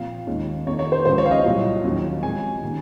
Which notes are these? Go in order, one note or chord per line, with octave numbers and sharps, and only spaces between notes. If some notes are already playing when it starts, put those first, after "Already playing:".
Already playing: A#2 F3 C4 F5
D#2 D#3 G#3 C#4
F2 D#3 A#3 C#5
C#5
C5
C#2 C#3 F3 C5
C#5
F5
D#5
C2 A#2 F#3
D#2 D#3 F#3 C#4
C3 F3 G#3 G#5
C3 D#3 A#3 C#4